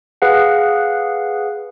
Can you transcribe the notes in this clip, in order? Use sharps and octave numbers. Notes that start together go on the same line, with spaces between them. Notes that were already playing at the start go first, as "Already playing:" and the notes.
G#4 B4 F5 F#5